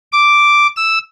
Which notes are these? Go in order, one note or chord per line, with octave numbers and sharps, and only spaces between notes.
D6
E6